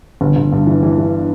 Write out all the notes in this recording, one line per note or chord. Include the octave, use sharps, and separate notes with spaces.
G1
G1
G2
E3
E3
E3